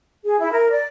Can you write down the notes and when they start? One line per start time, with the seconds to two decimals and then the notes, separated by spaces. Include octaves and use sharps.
0.24 G#4
0.40 E4
0.52 A#4
0.70 D5